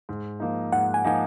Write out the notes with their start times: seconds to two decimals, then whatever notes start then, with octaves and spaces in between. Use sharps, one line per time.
0.09 G#2
0.40 F3 A#3 D#4
0.72 G#2 F#5
0.94 G#5
1.04 F3 A#3 D#4 G#5